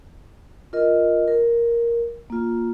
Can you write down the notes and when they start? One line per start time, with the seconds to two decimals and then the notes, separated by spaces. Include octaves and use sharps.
0.73 F4 A#4 D#5
1.28 A#4
2.30 A#3 F4